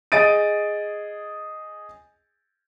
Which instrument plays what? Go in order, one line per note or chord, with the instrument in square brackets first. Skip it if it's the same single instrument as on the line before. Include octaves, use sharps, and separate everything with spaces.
[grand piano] G#4 D#5 A6 D7 D#7